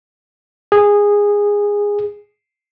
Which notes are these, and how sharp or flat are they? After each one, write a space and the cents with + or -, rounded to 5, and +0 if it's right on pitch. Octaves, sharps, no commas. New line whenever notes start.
G#4 -15